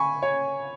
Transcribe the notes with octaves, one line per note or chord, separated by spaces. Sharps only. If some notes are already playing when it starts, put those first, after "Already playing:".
Already playing: G#5 B5 C#6
C#5